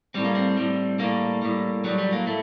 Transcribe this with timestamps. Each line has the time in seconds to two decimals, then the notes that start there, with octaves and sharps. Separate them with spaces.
0.14 A2 G3 C4
0.24 A#3
0.35 C4
0.57 A2 G3
0.99 A2 G3 A#3
1.42 A2 G3
1.84 A2 F#3 G3
1.98 G3
2.13 A#3
2.27 A2 A3